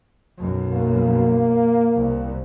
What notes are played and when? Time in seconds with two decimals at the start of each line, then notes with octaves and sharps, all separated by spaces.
0.37 B1 F#2
0.71 A#3
1.95 C2